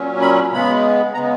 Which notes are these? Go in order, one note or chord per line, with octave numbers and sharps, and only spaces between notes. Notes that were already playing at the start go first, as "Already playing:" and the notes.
Already playing: A#2 F#3 C#4
B5
C#3 G#3 B3 B5
C#3 G#3 B3 A#5